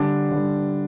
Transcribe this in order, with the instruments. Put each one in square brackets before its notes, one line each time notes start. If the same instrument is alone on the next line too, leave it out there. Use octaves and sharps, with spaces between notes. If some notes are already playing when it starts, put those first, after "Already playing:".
Already playing: [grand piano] D3 G3 D4
D3 G3